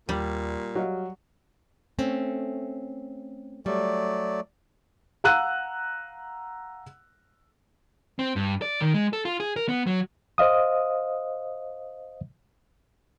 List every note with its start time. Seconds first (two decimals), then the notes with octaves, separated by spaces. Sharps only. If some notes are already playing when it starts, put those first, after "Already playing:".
0.09 D#2 A#2 G3
0.75 F#3 G4 D#5 F5
1.99 A3 C4 C#4
3.66 F#3 G3 A3 D5
5.24 F5 F#5 A#5 E6 F#6 D#7
8.19 C4
8.36 G2
8.62 D5
8.80 D#3
8.94 G#3
9.13 A4
9.25 F4
9.40 G#4
9.56 A#4
9.69 B3
9.87 F#3
10.38 C5 D#5 F5 D#6